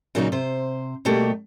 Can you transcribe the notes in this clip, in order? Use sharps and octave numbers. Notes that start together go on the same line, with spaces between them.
A#2 C#3 F#3 A#3 C#4 D#4
C3 C5
B2 G3 A3 A#3 G4